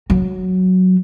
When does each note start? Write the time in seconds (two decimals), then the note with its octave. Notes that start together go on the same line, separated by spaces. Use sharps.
0.10 F#3